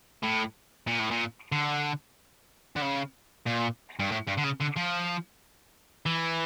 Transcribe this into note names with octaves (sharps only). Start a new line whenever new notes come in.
A2
A#2
A2
A#2
D3
D3
C#3
A#2
G2
A2
G2
D3
C#3
D3
F3
E3